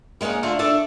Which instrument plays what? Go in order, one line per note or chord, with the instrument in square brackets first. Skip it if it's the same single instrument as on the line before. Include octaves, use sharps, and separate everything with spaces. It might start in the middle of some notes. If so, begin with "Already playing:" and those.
[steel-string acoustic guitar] G3 G#3 A#3 C#4 D#4
D3 A3 F4
A3 D4 A4